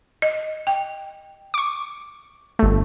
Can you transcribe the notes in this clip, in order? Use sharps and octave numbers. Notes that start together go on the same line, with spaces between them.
D#5
G5
C#6 D6
G1 A3